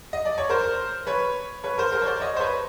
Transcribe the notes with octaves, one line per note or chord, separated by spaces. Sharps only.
D#5
D5
C#5
A#4 C5
B4 C#5
B4 C#5
A#4 C5
A#4 C5
C#5
C5 D5
C#5 D#5
C5
B4 C#5